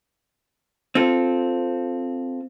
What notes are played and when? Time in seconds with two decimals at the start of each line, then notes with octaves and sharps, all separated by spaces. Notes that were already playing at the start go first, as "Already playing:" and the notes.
0.95 C4 F4 A4